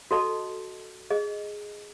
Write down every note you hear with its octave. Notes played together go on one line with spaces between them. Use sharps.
F#4 A4 D#5 A5
G#4 D#5